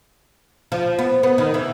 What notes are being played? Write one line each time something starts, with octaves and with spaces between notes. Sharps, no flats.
F3
B3
B3
D#3
E3